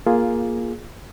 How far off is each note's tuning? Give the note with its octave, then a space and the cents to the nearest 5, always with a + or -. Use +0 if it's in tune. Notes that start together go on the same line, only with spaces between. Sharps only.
A#3 +15 F4 +0 G#4 +5